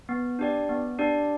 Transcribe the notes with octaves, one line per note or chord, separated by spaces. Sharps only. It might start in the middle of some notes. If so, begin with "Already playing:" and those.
B3
D4 G4 D5
B3
D4 G4 D5